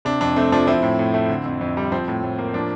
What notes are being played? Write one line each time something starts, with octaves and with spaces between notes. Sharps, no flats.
C3 D4
F2 D4
A3 C4
F3 D4
F3 C4 E4
A2
A2
A3
D3
F2
F2
G3
F3 C4
A2
A2
A#3
F3 D4